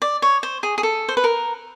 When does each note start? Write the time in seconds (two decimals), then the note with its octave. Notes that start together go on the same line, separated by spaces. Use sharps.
0.02 D5
0.22 C#5
0.43 C5
0.63 G#4
0.78 G#4
0.83 A4
1.08 C5
1.17 B4
1.24 A#4